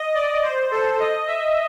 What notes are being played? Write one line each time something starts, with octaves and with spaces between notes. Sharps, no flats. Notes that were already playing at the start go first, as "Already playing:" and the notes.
Already playing: D#5
D5
C5
A4
D#5
E5